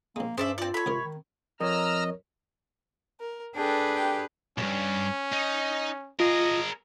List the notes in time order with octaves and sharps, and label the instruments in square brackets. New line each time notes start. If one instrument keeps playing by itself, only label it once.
[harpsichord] A#1 G#3 [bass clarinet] A#3
[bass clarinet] G2 [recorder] C#4 [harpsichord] G#4 [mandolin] C5 D5 E5
[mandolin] C4 D5 [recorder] F4
[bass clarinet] A4 [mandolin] C#5 B5
[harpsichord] C#2 G#2 A#4 [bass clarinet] C3
[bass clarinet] D#3
[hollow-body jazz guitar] F2 [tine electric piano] A#4 C#5 [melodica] D#5 [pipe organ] A#5 E6 F6
[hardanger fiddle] A#4
[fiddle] D4 A4 [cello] G#4 B4 [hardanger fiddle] G5
[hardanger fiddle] G4 G5
[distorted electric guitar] B1 G2 [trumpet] C#4
[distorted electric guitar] D#4
[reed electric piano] F4 [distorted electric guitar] G#4 A#4 [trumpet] D#5